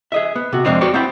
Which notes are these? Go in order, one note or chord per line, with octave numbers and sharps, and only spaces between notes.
G#4 D#5 E5
B3
C3 F#4
F2 C3 G#3 C4 D4 D#4
F#4 G4 B4 C#5 D5
B3 C4 E4 G5 B5